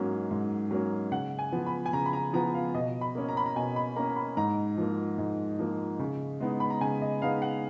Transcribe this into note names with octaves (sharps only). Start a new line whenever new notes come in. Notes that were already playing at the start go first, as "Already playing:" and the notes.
Already playing: G#2 F#3 A#3 C#4
G#2
F#3 A#3 C#4
C#3 F#5
G#5
F3 B3
B5
G#5
C#3 A#5
B5
A#5
F3 B3 A#5
F5
B2 D#5
B5
A#3 C#4
A#5
B5
A#5
B2 G#5
B5
A#3 C#4 A#5
B5
G#2 A#5
F3 A#3
G#2
F3 A#3
C#3
G#3 B3 D#4
B5
A#5
C#3 G#5
D#5
G#3 B3 D#4 F5
F#5